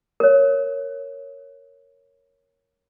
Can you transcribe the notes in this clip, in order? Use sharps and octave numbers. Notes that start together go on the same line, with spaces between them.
A#4 C#5